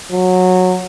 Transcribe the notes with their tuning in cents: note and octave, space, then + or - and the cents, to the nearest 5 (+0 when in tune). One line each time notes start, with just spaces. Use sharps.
F#3 -15